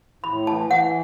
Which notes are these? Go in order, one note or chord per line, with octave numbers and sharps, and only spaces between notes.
A2 B5
E3 A5
E3 F#5